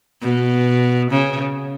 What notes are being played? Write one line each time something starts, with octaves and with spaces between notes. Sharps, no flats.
B2
C#3